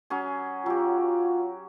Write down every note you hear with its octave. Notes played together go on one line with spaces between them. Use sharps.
F#3 C#4 G#4
F#3 F4 G4